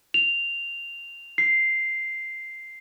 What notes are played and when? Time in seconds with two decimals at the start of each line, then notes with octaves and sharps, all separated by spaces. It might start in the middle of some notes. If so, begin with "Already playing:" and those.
0.14 F7
1.38 C7